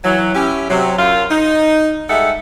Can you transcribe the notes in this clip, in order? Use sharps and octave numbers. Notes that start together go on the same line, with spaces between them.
E3 F#3
C#4 E4 G4
C3 F#3
F#2 F4
D#4
G3 G#3 D#4 A4 E5 F#5